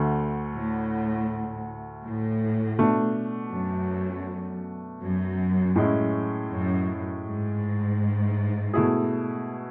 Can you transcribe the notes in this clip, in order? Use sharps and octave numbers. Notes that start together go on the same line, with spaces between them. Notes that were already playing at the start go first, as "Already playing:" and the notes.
Already playing: D2 D3 A3
A2
A2
B2 A3 D4
F#2
F#2
A2 G#3 C#4 E4
F#2
G#2
B2 A3 E4 G#4